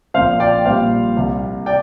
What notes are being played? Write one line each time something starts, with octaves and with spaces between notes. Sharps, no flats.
A#1 A#2 F3 C5 F5
D5 G5
A#1 A#2 G3 C5 F5
C2 C3 G3
D5 G5